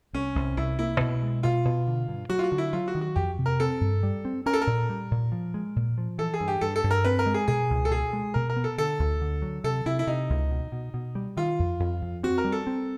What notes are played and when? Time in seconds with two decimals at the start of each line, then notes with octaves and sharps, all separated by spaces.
0.13 C2 C#4
0.35 C2
0.57 C2 E4
0.79 A#3 E4
1.00 B2
1.22 G#3
1.43 B2 F4
1.65 B2
1.87 D3
2.08 G2
2.29 F#3 F#4
2.39 F4
2.44 F#4
2.52 D3
2.58 E4
2.73 F#3 F4
2.88 F#4
2.95 D#3
3.01 F#4
3.16 F2 G4
3.38 C3
3.46 A#4
3.60 C4 A4
3.81 G2
4.03 G3
4.25 C4
4.46 C#4 A#4
4.53 A4
4.61 A#4
4.67 A#2
4.89 G3
5.11 A#2
5.32 F3
5.54 G#3
5.76 A#2
5.98 F3
6.18 E3 A4
6.34 G#4
6.41 G2
6.48 G4
6.61 G2 A4
6.76 A4
6.84 G2
6.91 A#4
7.05 C4 B4
7.19 A#4
7.26 G#3
7.34 G#4
7.48 B2 G#4
7.70 C#2
7.85 A4
7.91 B2 G#4
8.13 G#3
8.34 B2 A#4
8.50 A#4
8.56 B3
8.64 A4
8.78 D3 A4
8.99 D2
9.21 D3
9.42 F#3
9.64 C3 A4
9.86 C3 E4
9.99 E4
10.07 C3 D#4
10.30 C#2
10.51 B2
10.72 B2
10.94 B2
11.15 G3
11.37 D#3 F4
11.59 F2
11.80 F2
12.02 F2
12.23 C4 F#4
12.38 A#4
12.44 G3
12.52 A4
12.67 C4